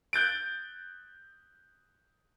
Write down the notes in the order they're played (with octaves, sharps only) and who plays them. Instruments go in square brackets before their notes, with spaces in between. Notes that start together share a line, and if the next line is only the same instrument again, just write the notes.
[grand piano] F#6 G6 A6 D7